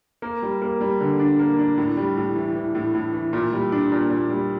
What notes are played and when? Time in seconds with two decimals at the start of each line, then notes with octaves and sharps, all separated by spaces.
0.22 A#3
0.42 G3
0.62 A#3
0.81 G3
1.00 D3
1.19 D4
1.39 A#3
1.59 D4
1.77 A2
1.97 G3
2.17 A2
2.36 E3
2.55 E3
2.75 A2
2.95 A2
3.13 E3
3.33 A#2
3.52 G3
3.72 D4
3.92 A#2
4.10 A#2
4.30 G3